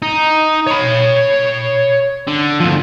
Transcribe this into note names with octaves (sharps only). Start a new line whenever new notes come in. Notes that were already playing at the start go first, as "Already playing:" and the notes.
D#4
C#5 B5
D3
D2 F3